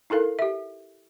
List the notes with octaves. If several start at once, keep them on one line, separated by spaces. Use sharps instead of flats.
D#4 E4 A4 A#4 F5
G4 E5